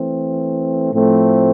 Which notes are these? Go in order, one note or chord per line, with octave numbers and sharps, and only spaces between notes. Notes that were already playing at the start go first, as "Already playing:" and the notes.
Already playing: E3 A3 C4
A2 F3 A3 C4